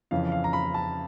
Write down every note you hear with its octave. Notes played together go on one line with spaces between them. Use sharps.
F2 C#3 E3 F5
F5
A#5
B5
A5